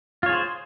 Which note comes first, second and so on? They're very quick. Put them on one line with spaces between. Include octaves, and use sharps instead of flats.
F4 C#5 G#4 C5